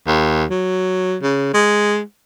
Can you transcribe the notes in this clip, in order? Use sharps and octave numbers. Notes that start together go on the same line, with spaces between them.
D#2
F#3
C#3
G#3